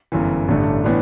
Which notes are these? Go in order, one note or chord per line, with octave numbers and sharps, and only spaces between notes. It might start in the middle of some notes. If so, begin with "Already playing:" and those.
G1 F#2 E3
A1 G2 D3 A3 D4
A2 E3 B3 D4